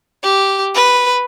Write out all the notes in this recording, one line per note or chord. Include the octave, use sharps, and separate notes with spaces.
G4
B4